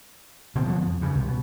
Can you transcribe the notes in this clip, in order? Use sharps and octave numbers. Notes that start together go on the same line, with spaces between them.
D1 B2 D3 C4
D3 F3 A3 B3
F2
G2 C#3
C2 C3
B2